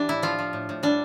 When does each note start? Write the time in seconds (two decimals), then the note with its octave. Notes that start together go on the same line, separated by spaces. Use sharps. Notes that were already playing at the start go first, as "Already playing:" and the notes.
Already playing: E3 D4 G4
0.08 A2 E4
0.23 F3 F4
0.39 F3
0.53 A2
0.69 A2
0.83 G3 D4